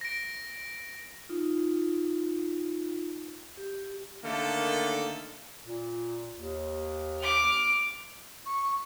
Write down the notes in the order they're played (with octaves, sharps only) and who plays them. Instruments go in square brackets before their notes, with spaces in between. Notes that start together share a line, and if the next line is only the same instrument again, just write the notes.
[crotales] A#6 D7
[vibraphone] D#4 F4
G4
[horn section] D3 D#3 A3 A#3 A4
[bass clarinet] A#2
D#2
[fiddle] D6 F6
[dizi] C#6